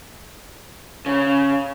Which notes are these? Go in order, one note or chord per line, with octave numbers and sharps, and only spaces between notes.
C#3